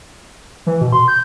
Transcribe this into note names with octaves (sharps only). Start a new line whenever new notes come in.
E3
B2
C6
G6